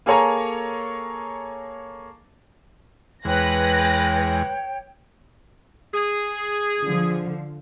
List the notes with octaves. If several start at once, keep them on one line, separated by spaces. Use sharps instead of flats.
A#3 G#4 A4 C#5 G#5 A#5
E2 G#3 B4 C#5 G5 F#6 A#6
G#4
D3 F3